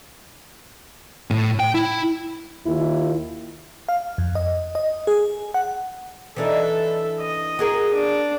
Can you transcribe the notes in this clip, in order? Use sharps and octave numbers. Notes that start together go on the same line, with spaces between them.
A2
G5
E4
D#2 D#3 E4 F4
F5
F2
D#5
D#5
G#4
F#5
E3 D4 D#4 A4 E5
D#5
F#4 G#4 A#4
D4